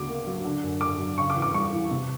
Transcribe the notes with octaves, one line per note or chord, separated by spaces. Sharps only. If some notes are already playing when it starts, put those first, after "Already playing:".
Already playing: D2 C#3 B3 D6
A#3
F#3
D3
F#2
F#2 D6
F#3
C#3 C#6
D6
E2
D6
G3 C#6
E3
C3